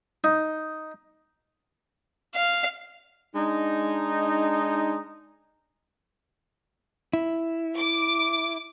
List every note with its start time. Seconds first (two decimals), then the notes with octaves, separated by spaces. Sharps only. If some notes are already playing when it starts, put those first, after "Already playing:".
0.24 D#4
2.35 F5
3.36 G#3 D4 D#4
7.13 E4
7.77 D6